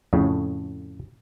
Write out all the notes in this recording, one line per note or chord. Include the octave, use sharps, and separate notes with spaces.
F2 A2 C#3